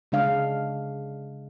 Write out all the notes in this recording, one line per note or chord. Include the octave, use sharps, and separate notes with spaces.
C#3 G#3 D4 F5